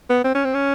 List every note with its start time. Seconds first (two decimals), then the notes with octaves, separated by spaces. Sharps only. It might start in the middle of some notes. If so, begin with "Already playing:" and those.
0.10 B3
0.24 C4
0.35 C#4
0.45 C4
0.54 C#4